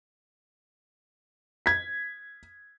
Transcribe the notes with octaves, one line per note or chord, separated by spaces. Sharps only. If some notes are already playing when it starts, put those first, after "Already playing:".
G#6 B6